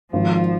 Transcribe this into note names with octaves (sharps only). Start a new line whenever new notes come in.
G#1 F3